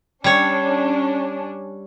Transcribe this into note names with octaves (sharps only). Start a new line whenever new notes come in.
G3 C#4 D4 C#5